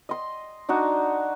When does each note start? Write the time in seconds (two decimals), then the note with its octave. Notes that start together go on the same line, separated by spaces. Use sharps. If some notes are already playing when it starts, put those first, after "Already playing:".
0.09 D#5 C6
0.69 D4 D#4 F#4